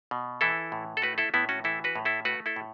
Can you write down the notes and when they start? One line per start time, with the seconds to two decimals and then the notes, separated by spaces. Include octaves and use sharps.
0.11 B2
0.41 E3 E4 A4
0.72 A2
0.97 A4
1.02 A3 F#4 B4
1.18 E4 A4
1.34 A2 B3 E4
1.49 C#4 F#4
1.64 E3 E4 A4
1.84 F#4 B4
1.96 A2
2.05 E4 A4
2.25 A3 F#4 B4
2.46 E4 A4
2.56 A2